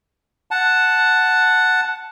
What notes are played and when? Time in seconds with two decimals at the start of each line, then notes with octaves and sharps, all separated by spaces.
0.51 F#5 A5